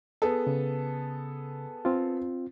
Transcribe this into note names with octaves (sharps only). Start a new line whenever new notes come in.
B3 G#4 A4
C#3
C4 F4